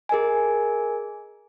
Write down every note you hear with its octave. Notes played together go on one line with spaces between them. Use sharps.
G#4 A#4 D#5 G#5